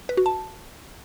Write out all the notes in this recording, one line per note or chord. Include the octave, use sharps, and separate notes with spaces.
B4
F#4
A5